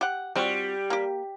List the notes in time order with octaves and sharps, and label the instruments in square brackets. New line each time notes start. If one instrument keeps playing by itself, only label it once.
[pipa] G4 F#5
[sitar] G3 [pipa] C4 F4 F#4
[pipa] A#3 G4